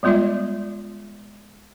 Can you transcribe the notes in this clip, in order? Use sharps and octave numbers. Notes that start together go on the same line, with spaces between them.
G3 G#3 B3 F4 D5 E5